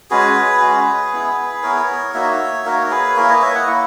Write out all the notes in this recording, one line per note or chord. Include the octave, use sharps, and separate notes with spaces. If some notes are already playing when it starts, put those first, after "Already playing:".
G#3 C#4 F#4 G#4 B4
G#3 C#4 F#4
B3 E4
B3 E4 A#4 C#5
A#3 D#4 F#4 C#5 E5
A#3 D#4 F#4 A#4 C#5
G#4 B4
A#3 E4 A#4 C#5
B4 D#5
C#5 E5
D#5 F#5
A#3 E4